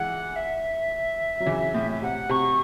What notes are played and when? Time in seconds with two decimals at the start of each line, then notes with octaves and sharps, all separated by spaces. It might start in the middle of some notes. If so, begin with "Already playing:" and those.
Already playing: E3 G#3 F#5
0.35 E5
1.40 F#3
1.46 C#3 E3
1.75 A2
1.90 E5
2.02 C3 F#5
2.29 C3 C#6